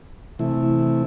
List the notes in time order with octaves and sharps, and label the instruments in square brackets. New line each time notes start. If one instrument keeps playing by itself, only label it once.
[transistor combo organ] C3 E3 A3 E4